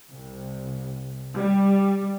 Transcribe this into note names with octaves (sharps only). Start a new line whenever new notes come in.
C2
G3